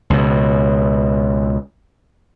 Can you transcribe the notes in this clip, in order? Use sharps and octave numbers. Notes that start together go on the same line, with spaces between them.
C#2 B2